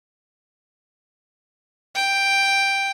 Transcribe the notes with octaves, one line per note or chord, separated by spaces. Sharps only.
G5